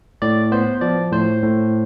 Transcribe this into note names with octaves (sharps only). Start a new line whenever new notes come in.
A2 D5
B3 C5
F3 D5
A2 C5
A2